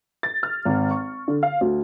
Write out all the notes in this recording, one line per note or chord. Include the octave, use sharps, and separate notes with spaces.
A6
F6
G#1
C#6
D3
F5
D2